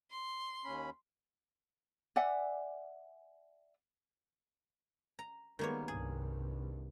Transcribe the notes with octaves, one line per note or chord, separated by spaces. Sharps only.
C6
D#2 C#4 B5
D5 E5 F#5 G#5
A#5
D#3 G3 G#3 A#3 B3 C#5
C2 G2 G#4